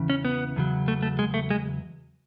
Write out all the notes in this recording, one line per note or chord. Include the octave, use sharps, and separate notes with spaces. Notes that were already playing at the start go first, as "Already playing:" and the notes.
Already playing: E2 C#3 E3
C#4
B3
E2 C#3 F#3
A3
A3
G#3
A3
G#3